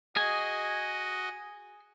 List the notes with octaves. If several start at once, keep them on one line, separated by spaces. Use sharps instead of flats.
F#4 G#4 D#5 G#5